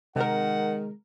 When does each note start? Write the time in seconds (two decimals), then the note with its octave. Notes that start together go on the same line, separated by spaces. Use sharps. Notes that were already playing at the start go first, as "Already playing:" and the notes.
0.16 C3 D#3 G#3 A#4 F#5